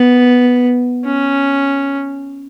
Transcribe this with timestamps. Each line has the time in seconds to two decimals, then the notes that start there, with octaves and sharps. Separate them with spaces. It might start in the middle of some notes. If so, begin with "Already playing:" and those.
Already playing: B3
1.05 C#4